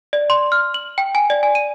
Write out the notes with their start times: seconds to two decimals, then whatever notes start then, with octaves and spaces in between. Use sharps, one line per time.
0.13 D5
0.30 C6
0.52 F6
0.74 F#7
0.98 G5
1.15 G#5
1.30 D5
1.43 G#5
1.55 D#7